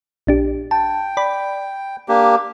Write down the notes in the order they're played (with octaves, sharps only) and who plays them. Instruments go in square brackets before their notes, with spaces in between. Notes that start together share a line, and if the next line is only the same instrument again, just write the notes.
[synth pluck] A#1 D4 G4
[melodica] G5 [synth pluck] A5
[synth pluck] D5 B5
[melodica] A#3 D4 G4